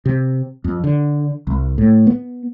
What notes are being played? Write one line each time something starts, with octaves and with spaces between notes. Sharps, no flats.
C3
F2
D3
C2
A2
B3